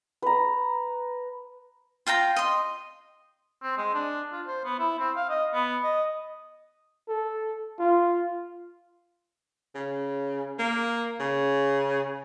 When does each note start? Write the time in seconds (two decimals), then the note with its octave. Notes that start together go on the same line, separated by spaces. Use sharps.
0.22 B4 A#5
2.07 F4 F5 G5 A#5
2.36 D#5 C6
3.62 C4
3.77 G#3
3.94 D4
4.32 F4
4.47 C5
4.65 B3
4.79 E4
4.99 C4
5.16 F5
5.29 D#5
5.54 B3
5.83 D#5
7.08 A4
7.79 F4
9.75 C#3
10.59 A#3
11.20 C#3